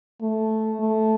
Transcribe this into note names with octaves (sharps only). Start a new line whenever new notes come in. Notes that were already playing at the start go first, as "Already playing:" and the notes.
A3
A3